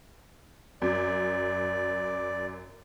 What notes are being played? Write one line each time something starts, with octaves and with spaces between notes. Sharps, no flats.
F#2 D5